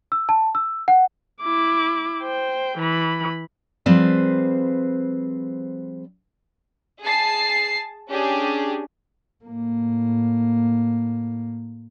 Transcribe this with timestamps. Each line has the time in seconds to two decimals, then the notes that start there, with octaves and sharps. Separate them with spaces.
0.12 E6
0.29 A5
0.55 E6
0.88 F#5
1.41 E4 D6
2.22 C5 G5
2.78 E3 B5
3.86 F3 G3 C4 G#4 B4 C5
7.01 G#4 A5 C7
8.09 C#4 D4 G4 G#4
9.45 A2 A#3